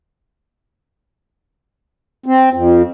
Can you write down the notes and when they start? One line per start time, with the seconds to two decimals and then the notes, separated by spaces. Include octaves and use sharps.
2.26 C4
2.53 F2